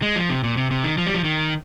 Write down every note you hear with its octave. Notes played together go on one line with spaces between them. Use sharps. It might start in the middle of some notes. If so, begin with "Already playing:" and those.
G#3
F3
C3
A#2
C3
C3
D#3
F3
G3
F3
D#3